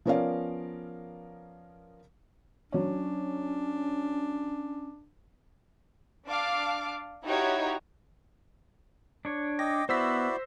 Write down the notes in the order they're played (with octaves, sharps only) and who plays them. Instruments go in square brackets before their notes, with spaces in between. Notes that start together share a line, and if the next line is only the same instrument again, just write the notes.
[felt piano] F3 B3 C#4 A#4 D5 F5
[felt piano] F#3 C#5 [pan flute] C#4 [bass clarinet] D4
[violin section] D4 F5 D6
D#4 E4 F#4 G4 C#5 A#5
[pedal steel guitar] D4 C#5
[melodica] D#5 G5 D6 [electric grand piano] A#6
[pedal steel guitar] B3 [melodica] E4 F#4 D5 [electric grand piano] C5 E6 B6